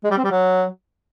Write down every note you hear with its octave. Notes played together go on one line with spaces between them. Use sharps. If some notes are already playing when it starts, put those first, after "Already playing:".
G#3
G3
C4
G3
F#3